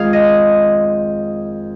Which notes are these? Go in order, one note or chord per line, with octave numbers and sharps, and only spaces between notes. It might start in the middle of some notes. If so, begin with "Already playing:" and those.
Already playing: F2 D#3 G#3 G#4 F5
D#5